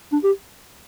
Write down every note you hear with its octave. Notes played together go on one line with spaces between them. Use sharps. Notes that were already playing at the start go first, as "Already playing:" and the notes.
D4
G4